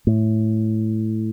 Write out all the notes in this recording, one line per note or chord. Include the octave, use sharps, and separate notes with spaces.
A2